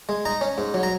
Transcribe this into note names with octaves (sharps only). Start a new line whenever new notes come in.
G#3
D#4 A#5
C#4
G#2
F#3
A#5